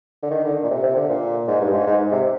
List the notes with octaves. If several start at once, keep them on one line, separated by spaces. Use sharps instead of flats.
D3
D#3
D3
A#2
C3
C3
D3
A#2
G#2
G2
G#2
G#2
C3